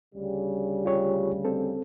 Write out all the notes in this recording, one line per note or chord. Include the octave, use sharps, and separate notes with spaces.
D2 C#3 G3
F4 G4 C#5
C4 A4